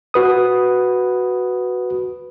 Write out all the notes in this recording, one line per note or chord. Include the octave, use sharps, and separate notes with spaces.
F#4 B4 D#6